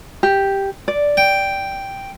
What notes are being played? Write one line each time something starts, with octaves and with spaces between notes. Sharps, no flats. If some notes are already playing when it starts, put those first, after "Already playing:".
G4
D5
G5